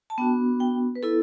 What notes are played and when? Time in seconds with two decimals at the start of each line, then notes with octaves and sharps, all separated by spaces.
0.10 A5
0.18 B3 D4 F#4 G5
0.60 G5
0.96 B4
1.03 B3 E4 A4